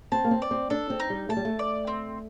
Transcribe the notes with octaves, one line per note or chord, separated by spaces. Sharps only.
C4 A5
A#3
C4
D5
C4
D4 A4
C4
D#4
G3
A3 A5
G3
A3
D5
C4